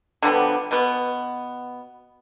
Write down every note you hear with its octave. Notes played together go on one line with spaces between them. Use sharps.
D3 F3 G3 B3
B2 B3